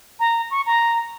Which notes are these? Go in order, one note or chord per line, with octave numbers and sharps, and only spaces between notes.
A#5
C#6
A#5